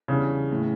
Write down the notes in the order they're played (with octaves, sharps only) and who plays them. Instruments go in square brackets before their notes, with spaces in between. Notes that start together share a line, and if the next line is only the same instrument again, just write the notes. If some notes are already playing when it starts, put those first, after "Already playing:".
[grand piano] E2 E3 G3 D4 [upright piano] C#3
[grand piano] A2 E3